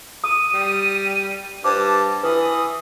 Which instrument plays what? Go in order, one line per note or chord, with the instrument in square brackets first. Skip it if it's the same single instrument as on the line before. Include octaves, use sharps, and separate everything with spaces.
[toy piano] D#6 [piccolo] D#7
[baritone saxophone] G3
[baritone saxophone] G2 [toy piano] C5 D6 [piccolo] A5
[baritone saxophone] E3 [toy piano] B4 [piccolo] D#6